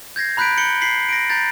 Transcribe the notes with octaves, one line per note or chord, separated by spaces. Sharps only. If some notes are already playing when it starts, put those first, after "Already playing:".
G6 G#6 A#6 C7
A#5 B5 F#6 G6 B6 D7
G6 C#7 F#7 G7
B6 C7 F#7
A#6 D7
A#5 G6 A6